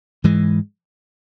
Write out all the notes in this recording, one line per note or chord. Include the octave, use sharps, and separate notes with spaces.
G#2 E3 G#3